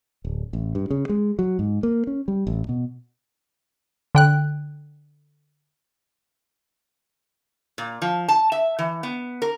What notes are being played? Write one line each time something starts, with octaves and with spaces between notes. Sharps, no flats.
D1
A1
G2
C#3
G#3
F#3
G#2
A#3
C#4
G3
A1
B2
D3 G5 F#6
A#2
F3
A5
E5
E3
B3
A#4